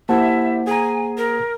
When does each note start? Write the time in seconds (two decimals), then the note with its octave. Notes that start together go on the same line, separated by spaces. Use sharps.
0.09 A#3 E4 G4 C5 E5 F#5 A5
0.67 G#4 G#5 A#5
1.17 A#4